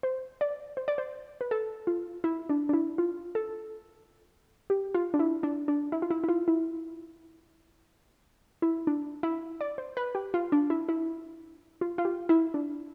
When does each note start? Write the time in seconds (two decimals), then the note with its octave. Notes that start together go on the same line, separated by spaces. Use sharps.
0.03 C5
0.41 D5
0.77 C5
0.88 D5
0.98 C5
1.41 B4
1.51 A4
1.87 F4
2.24 E4
2.49 D4
2.69 D4
2.73 E4
2.98 F4
3.35 A4
4.70 G4
4.94 F4
5.14 D4
5.19 E4
5.43 D4
5.68 D4
5.92 E4
6.02 F4
6.10 E4
6.24 E4
6.29 F4
6.48 E4
8.62 E4
8.87 D4
9.23 E4
9.61 D5
9.78 C5
9.97 B4
10.15 G4
10.34 F4
10.52 D4
10.70 E4
10.89 E4
11.81 F4
11.98 F4
12.05 G4
12.29 E4
12.54 D4